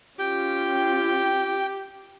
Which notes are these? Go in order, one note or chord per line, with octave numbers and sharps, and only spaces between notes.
C#4 F4 G4 G5